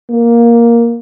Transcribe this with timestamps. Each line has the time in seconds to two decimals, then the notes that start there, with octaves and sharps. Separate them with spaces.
0.10 A#3